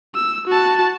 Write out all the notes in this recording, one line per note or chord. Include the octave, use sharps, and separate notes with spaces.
E6
F#4 A5